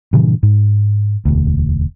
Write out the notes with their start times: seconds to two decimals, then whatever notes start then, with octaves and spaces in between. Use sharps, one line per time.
0.13 G2 A#2 C#3 E3
0.43 G#2
1.25 E1 D2